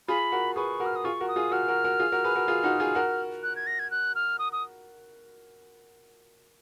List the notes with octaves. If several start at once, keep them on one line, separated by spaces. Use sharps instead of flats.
F4 G#4 B5
F#4 A#4
G#4 B4 C#6
F#4 A#4
F6
D#6
F4 G#4 C#6
F#4 A#4
D#6
F4 G#4
F#4 A#4 F6
F#4 A#4
F#4 A#4
F4 G#4
F#4 A#4
G#4 B4
F#4 A#4
F4 G#4
D#4 F#4
F4 G#4
F#4 A#4
F#6
G#6
A#6
G#6
F#6
F6
D#6
D#6